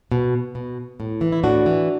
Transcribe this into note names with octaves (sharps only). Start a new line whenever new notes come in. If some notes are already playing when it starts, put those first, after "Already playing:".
B2
B2
A2
E3
E4
A2 D4 F#4
E3